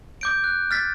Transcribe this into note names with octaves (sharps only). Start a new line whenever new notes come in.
D6 G6 D7
F#6
F6 A6 B6